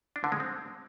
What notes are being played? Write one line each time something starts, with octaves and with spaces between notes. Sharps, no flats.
D4
D3
G#3
C4